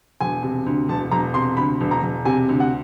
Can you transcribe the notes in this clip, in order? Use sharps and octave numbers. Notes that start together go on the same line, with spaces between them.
E1 G#5
C3
D2
E1 A5
E1 A#5
C3 C6
D2 B5
E1
A#5
E1
C3 G#5
D2
F#5